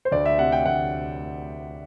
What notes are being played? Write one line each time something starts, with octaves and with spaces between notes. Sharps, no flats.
C5
D2 D5
E5
C3 F#5
G5
D2 F#5